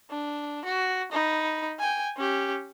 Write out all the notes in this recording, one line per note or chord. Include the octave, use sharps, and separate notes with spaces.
D4
F#4
D#4 B5
G5 G#5
C#4 G4